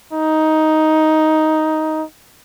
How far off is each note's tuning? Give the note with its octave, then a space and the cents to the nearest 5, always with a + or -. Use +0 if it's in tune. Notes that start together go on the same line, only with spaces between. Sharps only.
D#4 +10